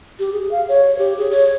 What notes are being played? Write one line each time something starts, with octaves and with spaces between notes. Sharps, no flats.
G4
G#4
F5
C#5
G4
G#4
C#5